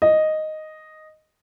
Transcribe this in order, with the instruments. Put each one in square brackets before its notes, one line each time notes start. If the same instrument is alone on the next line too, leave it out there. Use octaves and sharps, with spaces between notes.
[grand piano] D#5